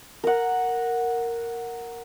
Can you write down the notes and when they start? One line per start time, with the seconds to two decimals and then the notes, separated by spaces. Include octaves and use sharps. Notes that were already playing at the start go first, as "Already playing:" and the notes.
0.24 A#4 F#5